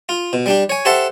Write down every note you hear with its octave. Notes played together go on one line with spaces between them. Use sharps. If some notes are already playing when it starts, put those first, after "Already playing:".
F4
B2
G3 D4 G4
C#5 G#5
G4 A4 C5 E5 F#5 A5